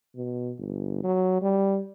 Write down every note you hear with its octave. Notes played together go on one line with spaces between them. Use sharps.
B2
G1
F#3
G3